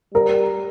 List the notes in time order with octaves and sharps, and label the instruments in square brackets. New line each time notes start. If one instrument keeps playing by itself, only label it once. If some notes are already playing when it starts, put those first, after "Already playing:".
[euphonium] G3 [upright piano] A#4